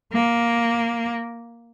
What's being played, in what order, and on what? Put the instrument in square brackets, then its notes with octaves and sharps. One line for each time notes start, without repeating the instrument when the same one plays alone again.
[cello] A#3